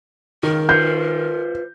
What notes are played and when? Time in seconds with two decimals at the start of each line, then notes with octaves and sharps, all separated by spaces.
0.43 C#2 D#3 A#4
0.69 F4 B4 C5 G6